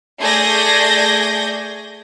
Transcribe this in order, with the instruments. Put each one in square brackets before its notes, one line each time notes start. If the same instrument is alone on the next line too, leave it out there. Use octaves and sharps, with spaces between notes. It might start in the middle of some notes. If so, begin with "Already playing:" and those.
[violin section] A3 G#4 D5 G6 G#6 A#6